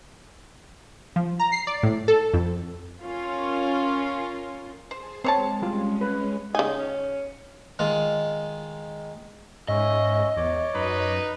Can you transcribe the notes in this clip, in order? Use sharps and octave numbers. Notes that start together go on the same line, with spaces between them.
F3
A#5
C7
D5
A2
A4
F2
C#4 F4 A#4
G#4 C5 G#5 A5
G#3 C4 C5 C#5 A5
G3 G#3 C#4 F4
B4
C#3 D#4 G#5
C#4
D#3 G#3 F4
G#2 C#4 D#5 E5
E2 C#5 D5 D6
F#2 D#4 B4